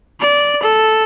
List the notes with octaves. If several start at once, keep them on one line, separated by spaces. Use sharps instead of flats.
D5
A4